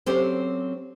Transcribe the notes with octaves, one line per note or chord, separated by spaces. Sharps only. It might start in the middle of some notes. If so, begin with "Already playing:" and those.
F#3 C4 C#4 G4 A4 C5